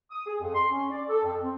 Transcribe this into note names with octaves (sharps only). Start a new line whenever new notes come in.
D#6
G#4
F2
C6
C#4
D5
A4
F2
C4